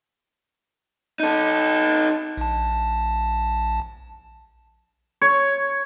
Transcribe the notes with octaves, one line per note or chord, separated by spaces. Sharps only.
D#4 A4
A#1 A5
C#5